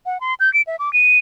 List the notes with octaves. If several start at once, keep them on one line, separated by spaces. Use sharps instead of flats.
F#5
C6
G6
D7
E5
D6
D#7